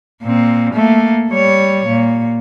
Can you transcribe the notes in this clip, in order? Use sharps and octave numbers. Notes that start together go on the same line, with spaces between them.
A#2 C4
A3 A#3
G3 C#5
A#2